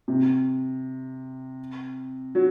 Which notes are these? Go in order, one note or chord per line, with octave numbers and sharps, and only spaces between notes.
C3
F#3